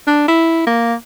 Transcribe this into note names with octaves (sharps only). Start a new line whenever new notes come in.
D4
E4
A#3